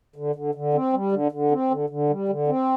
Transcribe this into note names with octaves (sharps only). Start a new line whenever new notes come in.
D3
D3
D3
C4
G3
D3
D3
C4
D3
D3
G3
D3
C4